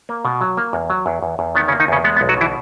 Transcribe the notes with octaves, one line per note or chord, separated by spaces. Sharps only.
A#3
B2
F#3
A#3
E2
F#3
E2
E2
E2
D#3 B3
C#3 C#4
A#3
D#3 D#4
E2 C#3 C#4
G#3 B3
B3
B1
F#3 F#4
B2 E3 E4